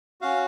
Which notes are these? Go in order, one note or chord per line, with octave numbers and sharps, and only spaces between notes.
C#4 F#4 F5